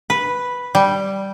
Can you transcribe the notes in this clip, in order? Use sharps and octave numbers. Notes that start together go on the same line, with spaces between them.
B4
G3